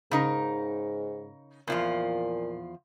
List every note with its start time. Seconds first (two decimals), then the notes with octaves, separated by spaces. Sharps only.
0.11 G#2 C#3 D#4 A#4
1.67 E2 A#2 F3 F4